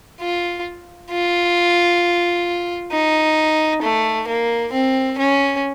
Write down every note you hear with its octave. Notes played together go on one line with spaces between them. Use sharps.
F4
F4
D#4
A3
A#3
C4
C#4